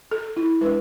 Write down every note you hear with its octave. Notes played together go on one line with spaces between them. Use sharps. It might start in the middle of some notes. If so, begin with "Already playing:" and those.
A4
E4
G#3 D4 B4